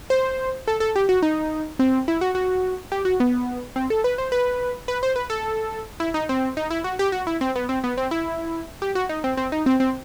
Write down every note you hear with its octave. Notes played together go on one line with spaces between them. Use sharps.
C5
A4
A4
G4
F#4
D#4
C4
E4
F#4
F#4
G4
F#4
B3
C4
A4
B4
C5
B4
B4
C5
B4
A4
E4
D#4
C4
D#4
E4
F#4
G4
F#4
E4
C4
B3
C4
B3
C4
E4
G4
F#4
D#4
C4
C4
D#4
C4
C4